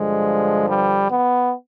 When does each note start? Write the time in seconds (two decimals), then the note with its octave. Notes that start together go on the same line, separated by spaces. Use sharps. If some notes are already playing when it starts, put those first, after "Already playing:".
Already playing: G2 D3 F3 G#3
0.69 G3
1.09 B3